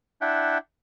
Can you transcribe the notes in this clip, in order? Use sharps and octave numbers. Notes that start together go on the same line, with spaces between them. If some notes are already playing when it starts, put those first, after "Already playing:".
D4 E4 E5 F#5 G5